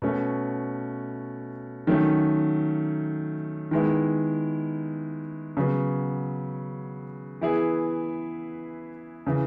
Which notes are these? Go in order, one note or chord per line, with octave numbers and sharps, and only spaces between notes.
B2 A3 C#4
D#3 F#3 A3 C#4
D#3 G#3 B3 E4
C#3 F#3 B3
E3 B3 E4 G#4
C#3 E3